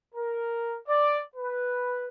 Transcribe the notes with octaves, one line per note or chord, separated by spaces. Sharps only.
A#4
D5
B4